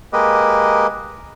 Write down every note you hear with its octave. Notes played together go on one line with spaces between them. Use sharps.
G#3 A#3 G4 B4 D#5